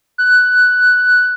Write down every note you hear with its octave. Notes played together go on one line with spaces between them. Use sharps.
F#6